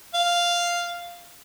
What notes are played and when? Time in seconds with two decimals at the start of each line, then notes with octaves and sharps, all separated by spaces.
0.14 F5